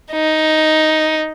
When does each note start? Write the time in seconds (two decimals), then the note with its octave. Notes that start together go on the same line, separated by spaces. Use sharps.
0.12 D#4